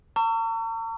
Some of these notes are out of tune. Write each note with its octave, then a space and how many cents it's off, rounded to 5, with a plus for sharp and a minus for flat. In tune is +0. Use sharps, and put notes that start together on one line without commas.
A#5 -45 C#6 +30 E6 +40